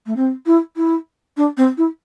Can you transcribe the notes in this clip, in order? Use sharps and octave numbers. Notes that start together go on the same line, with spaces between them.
A3
C4
E4
E4
D4
C4
E4